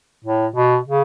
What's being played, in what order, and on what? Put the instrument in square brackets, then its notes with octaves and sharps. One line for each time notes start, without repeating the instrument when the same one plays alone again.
[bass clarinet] A2
B2
C#3